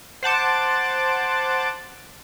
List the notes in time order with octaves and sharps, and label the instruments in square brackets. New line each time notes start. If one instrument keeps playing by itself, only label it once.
[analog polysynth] C5 F#5 A5 D6